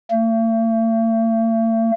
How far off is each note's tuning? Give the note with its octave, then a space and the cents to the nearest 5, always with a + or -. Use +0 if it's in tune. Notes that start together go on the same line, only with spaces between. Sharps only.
A3 +45